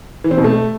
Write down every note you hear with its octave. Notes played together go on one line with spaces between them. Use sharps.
E3
C4
B2
A3